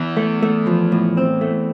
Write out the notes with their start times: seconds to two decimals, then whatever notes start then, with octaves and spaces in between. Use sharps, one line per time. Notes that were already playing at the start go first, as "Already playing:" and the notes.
Already playing: E2 E3
0.17 A3
0.42 A3
0.67 F3
0.92 A2
1.17 C4
1.41 A3